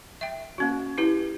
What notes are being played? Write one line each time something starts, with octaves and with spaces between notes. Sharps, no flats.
E5 G5
A#3 C#4 F#4
E4 G4 B4